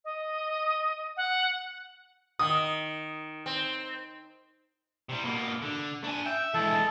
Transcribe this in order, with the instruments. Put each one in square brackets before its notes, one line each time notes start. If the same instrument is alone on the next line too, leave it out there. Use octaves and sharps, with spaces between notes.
[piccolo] D#5
F#5
[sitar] D#3 [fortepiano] D#6
[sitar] C4
[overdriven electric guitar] C3 G3
B2 A#3
D3
D4 G#5
[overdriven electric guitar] E5 [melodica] G5
[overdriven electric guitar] E3 G#3 [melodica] A4